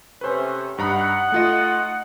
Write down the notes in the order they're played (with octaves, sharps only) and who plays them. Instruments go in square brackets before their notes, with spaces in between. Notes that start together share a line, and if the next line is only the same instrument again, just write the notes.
[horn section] C3 A3 C#4 [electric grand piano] B4 C5
[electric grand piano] G2 A#5 B5 [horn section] D#4 F#5
[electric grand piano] A3 F4 D#5